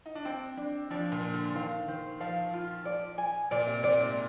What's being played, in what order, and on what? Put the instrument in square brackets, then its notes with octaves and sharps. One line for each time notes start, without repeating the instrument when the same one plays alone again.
[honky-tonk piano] D#4
D4
[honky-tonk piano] C4 [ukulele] G5
[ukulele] D4
[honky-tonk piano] F3 [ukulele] D4
[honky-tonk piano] A#2
[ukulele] D4
[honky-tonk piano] D3
[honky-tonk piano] D#3 [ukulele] F5
[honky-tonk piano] D#3 [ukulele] C5
[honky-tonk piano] F3 [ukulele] F5
[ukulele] F4
D5
G#5
[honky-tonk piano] A#2 [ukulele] D5
[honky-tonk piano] C3
[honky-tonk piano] A#2 [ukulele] D5
[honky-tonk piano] G#2